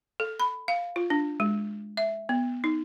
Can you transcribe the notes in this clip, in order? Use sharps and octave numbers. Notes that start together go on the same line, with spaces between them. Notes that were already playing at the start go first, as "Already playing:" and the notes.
A4
B5
F5
F4
D4
G#3
E5
B3
D#4